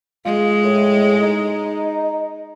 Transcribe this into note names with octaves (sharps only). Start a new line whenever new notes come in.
G#3 F4
A2
D#4